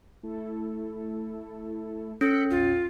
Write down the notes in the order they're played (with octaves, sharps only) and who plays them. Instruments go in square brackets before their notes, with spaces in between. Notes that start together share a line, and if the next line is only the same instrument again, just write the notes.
[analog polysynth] A3 E4 A4
[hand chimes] C#4 [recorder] A4 [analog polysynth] F#6 B6 C#7
[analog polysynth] A#1 E2 [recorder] F4